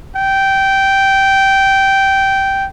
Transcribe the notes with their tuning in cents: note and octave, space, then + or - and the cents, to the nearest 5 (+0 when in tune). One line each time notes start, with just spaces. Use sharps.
G5 -10